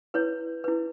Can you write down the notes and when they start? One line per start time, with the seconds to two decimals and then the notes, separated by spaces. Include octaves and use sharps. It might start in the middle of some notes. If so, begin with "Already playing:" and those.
0.14 E4 B4 C#5
0.64 E4 B4